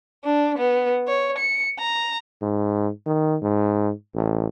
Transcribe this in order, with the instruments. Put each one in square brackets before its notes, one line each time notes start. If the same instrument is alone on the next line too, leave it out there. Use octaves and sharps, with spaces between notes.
[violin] D4
B3
C#5
C#7
A#5
[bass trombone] G#2
D#3
G#2
A1